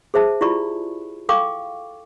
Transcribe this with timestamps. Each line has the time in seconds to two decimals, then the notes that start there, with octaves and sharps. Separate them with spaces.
0.14 G#4 C5 E5 A5
0.41 E4 F4 G4 D5 B5 C#6
1.29 A4 F5 G5 C#6 D6